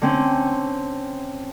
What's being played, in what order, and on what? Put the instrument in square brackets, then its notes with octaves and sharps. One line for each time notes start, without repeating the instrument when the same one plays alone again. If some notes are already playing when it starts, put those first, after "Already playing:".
[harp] D3 C4 C#4